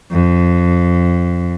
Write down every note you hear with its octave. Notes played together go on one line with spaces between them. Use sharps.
F2